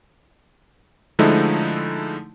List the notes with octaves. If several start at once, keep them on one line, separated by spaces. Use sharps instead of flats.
D3 F3 G#3 A3 D#4 E4